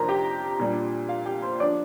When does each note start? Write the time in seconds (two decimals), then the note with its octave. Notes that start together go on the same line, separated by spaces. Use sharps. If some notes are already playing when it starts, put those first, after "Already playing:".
Already playing: F2 C3 A#3 D4 A#4 C5 A#5
0.09 G4 G5
0.59 A#2 G3 D4
1.09 F4 F5
1.26 G4 G5
1.42 C5 C6
1.60 F3 D4 D5 D6